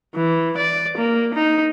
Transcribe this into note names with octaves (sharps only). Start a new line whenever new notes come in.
E3
D5
A#3
D#4